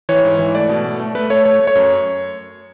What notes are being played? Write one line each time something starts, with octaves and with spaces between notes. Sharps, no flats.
E3 C#5
G#2
E3
A3 D5
B2
A3
A3
A3 B4
A3 C#5
A3 C#5
A3
C#5
F#2